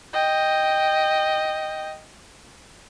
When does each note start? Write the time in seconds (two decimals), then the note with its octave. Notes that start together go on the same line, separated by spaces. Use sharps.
0.13 D#5 G5